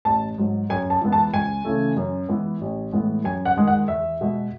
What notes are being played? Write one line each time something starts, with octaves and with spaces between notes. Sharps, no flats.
A1 A5
G#2 F#3
F#2 G#5
A5
E3 G#3 B3
A5
C#2 G#5
C#3 E3 A3
F#2
E3 G#3 B3
A1
A2 E3 G#3 B3
F#2 G#5
F#5
D#3 G#3
F#5
E2 E5
B2 G#3